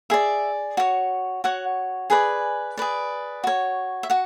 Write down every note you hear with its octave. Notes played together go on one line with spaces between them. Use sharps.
G#4 D5 E5
F#4 C#5
F#4 C#5 F#5
G#4 B4 D5 G#5
G#4 B4 D5
F#4 C#5
E5
F#4 F#5